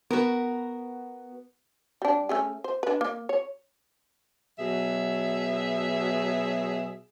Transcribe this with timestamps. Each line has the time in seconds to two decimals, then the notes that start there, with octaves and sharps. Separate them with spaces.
0.11 B3 F#4 A#4
2.02 G3 D4
2.29 A3 C#4 G#4
2.64 C5
2.83 D4 B4
3.01 A#3
3.29 C#5
4.59 B2 F#3 G#4 E5